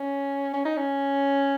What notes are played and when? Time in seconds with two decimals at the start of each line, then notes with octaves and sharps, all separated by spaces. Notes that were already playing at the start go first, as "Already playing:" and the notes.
Already playing: C#4
0.53 C#4
0.65 D#4
0.77 C#4